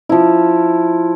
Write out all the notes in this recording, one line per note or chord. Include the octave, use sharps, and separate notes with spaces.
F3 E4